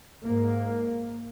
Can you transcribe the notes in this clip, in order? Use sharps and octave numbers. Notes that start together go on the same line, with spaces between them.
G#2 A#3